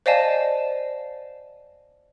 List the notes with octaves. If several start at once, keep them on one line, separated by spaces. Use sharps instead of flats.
C5 D5 D#5 F5 G#5 A5